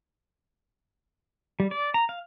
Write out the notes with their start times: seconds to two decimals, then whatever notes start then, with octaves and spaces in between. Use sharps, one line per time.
1.60 G3
1.71 D5
1.94 A#5
2.09 F5